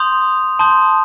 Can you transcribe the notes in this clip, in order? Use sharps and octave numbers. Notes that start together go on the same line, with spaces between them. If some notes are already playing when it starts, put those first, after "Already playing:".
Already playing: C6 D#6 G6 F7
A5 C6 D#6 G6